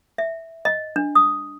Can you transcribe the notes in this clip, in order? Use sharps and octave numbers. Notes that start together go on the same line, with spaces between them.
E5
D#5
D4
D#6